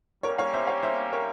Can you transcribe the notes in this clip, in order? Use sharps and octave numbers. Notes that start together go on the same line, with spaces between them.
G3 A#3 C#4 G4 A#4 C#5
C#5 F5
C5 E5
C#5 F5
C5 E5
A#4 C#5